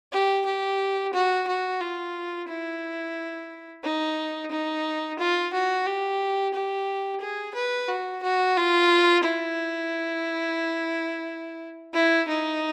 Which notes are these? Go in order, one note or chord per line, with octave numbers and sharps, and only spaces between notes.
G4
G4
F#4
F#4
F4
E4
D#4
D#4
F4
F#4
G4
G4
G#4
B4
F#4
F#4
F4
E4
E4
D#4